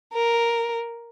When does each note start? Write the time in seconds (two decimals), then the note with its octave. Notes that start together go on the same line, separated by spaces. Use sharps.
0.14 A#4